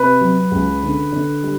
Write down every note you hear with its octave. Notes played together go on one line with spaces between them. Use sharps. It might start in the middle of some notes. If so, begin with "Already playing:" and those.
Already playing: C3 B4
F#3
C#2
D3
D3
G3